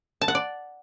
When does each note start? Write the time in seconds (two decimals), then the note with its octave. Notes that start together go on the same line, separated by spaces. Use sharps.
0.21 A5
0.28 F#5
0.35 D5